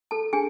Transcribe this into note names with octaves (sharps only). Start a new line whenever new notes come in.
A4 A5
D4 G#4 G#5